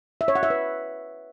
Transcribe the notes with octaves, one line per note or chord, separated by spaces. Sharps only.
E5
C#5
F#5
E5
B4